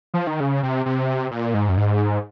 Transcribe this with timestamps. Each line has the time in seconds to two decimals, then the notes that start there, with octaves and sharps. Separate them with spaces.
0.14 F3
0.27 D#3
0.40 C#3
0.63 C3
0.86 C3
1.31 A#2
1.54 G#2
1.69 F#2
1.77 G#2